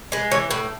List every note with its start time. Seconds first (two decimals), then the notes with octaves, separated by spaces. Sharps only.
0.12 G#3 B4
0.31 E3 C#5
0.51 A2 B4